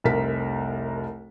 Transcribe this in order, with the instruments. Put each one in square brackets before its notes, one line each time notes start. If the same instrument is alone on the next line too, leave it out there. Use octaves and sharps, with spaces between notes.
[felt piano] F1 C2 A#4 B6